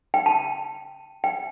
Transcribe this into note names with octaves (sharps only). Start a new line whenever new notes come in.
G5
A5
G5